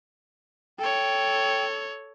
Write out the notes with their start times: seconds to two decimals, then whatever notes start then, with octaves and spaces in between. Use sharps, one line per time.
0.79 A4 C#5 G5